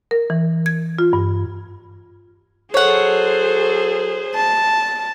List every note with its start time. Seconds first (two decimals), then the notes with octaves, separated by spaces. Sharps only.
0.11 A#4
0.30 E3
0.66 G#6
0.99 F4
1.13 G2
2.74 F#3 G#4 A4 C5 C#5 F#5
4.35 A5